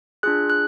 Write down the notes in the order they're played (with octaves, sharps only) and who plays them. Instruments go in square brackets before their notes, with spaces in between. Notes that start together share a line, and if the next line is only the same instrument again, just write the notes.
[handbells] D4 F4 G#4 F#6
F#6